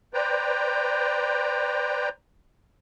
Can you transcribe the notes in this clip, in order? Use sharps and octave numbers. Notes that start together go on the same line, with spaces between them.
B4 C5 D5 G5 A#5